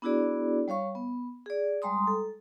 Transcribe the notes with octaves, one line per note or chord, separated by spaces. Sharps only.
B3 D4 E4 F#4 G#4 D5
G3 C#5 F5 C#6
B3
G#4 D5
G3 G#3 A#5 C6 D#6
A4